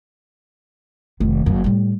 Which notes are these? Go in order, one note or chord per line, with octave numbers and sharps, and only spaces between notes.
F1 D#3
F#1 F#2
A2 G3